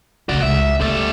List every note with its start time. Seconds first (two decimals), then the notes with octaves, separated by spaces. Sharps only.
0.29 D2 C#3 F#4 D5
0.42 C#2 E5
0.81 D2 G3 A4